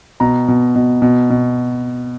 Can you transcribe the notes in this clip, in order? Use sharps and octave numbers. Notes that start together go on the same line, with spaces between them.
B2 A#5
B2
B2
B2
B2